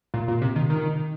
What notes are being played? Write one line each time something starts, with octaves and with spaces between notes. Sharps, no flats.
A#2
A#2
C3
D#3
D#3